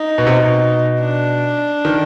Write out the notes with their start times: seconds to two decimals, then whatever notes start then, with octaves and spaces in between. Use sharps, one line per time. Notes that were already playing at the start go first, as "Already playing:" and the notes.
Already playing: D#4
0.18 B2
0.27 C3
0.34 B2
1.01 D4
1.85 D#3